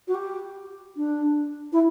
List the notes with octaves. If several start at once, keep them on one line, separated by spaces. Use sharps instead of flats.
F#4
G4
D4
E4